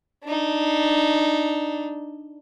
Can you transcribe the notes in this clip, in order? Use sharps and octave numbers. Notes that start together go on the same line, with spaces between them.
D4 D#4